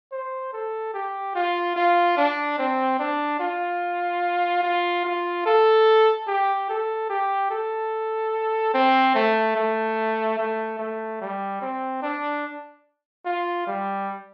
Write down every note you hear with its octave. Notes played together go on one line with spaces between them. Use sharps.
C5
A4
G4
F4
F4
D4
C4
D4
F4
F4
F4
A4
G4
A4
G4
A4
C4
A3
A3
A3
A3
G3
C4
D4
F4
G3